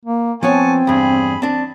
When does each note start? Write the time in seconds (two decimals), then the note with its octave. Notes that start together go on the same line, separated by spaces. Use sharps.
0.05 A#3
0.43 F3 B3 C4 C#5 G#5 A5 C#6
0.87 E2 G2 G#4 B5
1.42 C4 D4 A5